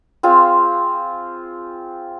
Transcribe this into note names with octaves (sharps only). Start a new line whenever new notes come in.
C4 F4 G#4 F5